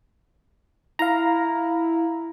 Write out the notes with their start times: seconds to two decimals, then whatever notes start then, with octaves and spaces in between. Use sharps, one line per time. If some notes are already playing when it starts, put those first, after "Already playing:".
0.99 E4 F5 A#5